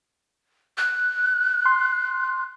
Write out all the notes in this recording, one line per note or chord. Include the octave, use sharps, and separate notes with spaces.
F#6
C6